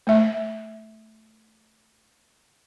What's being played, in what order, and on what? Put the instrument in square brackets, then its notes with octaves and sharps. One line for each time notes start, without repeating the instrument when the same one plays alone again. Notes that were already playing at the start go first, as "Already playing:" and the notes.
[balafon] A3 E5